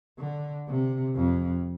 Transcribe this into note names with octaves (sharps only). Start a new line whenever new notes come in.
D3
C3
F2